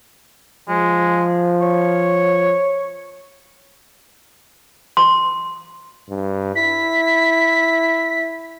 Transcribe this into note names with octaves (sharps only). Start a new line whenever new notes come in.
F3 G#3
C#5
C6
G2
E4 B6